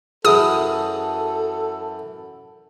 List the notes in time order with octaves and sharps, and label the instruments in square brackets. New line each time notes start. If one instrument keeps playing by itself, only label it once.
[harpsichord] F#2 E3 [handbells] G#4 [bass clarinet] A4 [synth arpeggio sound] D#6